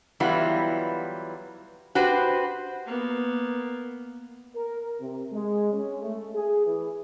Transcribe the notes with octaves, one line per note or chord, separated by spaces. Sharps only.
E3 F#3 G3 B3 E4 F4
F#4 G4 B4 C5
A#3 B3
A#4
C3
G#3
C#4
A3
G#4
E3